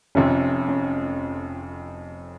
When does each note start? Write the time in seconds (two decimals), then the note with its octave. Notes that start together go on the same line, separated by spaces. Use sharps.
0.15 F1 F2 C3 C#4
0.69 C#4